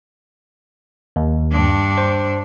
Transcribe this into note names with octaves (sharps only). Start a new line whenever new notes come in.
D#2
G2 D4
C5